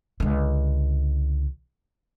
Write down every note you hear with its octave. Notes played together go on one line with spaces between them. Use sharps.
C#2 D3